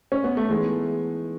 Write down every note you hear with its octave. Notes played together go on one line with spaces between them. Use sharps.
C#4
B3
A3
E3 G#3 B3 D#4